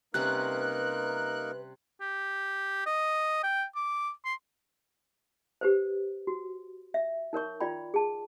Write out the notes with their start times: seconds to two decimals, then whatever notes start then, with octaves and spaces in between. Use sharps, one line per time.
0.14 C3 G3 A#3 C#4 D#4 A#4 B4 F#6
2.01 G4
2.86 D#5
3.43 G5
3.75 D6
4.25 C6
5.61 G4 B4 C5
6.27 F#4
6.94 E5
7.33 D#4 A#4 C#5 C#6
7.61 F4 D5 G5 B5
7.94 G#4 A5